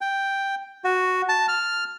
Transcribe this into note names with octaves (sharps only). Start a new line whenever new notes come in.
G5
F#4
A5
F6